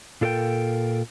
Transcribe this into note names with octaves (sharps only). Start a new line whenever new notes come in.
A#2 F4 A4 A#4 C5 G5